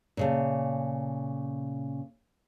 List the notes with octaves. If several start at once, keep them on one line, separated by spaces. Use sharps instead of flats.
A#2 C#3 A3